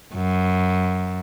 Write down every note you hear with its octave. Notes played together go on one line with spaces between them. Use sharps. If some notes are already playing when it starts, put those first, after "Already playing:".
F#2